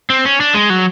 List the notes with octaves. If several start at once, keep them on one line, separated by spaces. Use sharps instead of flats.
C4
C#4
D4
G#3
F#3